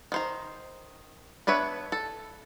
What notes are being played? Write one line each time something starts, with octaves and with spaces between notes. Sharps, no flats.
D#3 C5 A#5
B3 D4 B4 C#5 E5
A4